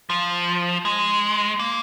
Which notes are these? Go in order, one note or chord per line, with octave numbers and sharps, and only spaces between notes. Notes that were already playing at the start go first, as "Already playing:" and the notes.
F3
G#3
A#3